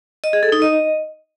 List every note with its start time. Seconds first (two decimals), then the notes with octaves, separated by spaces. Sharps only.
0.24 D#5
0.33 G#4
0.43 A4
0.52 D#4
0.62 D#5